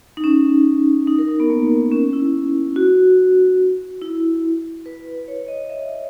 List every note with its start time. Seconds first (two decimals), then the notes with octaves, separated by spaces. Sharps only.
0.17 D#4
0.24 C#4
1.07 D#4
1.19 A#4
1.29 D#4
1.40 B3
1.50 A#3
1.70 B3
1.92 C#4
2.13 E4
2.76 F#4
4.02 E4
4.86 B4
5.28 C#5
5.48 D#5
5.70 E5